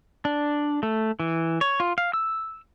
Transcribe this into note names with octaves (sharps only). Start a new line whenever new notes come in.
D4
A3
E3
C#5
F4
F5
E6